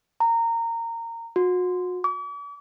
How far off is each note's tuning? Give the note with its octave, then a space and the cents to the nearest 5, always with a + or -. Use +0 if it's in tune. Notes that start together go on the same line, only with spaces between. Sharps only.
A#5 -20
F#4 -35
D6 -45